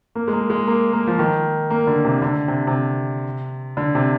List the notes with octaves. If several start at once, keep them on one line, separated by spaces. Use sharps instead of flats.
A#3
G#3
A#3
G#3
A#3
A#3
F3
D#3
A#3
D3
C3
D3
C3
C3
D3
C3